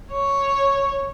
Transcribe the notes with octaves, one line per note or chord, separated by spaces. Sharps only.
C#5